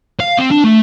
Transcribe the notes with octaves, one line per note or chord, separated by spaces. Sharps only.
F5
C4
D4
A3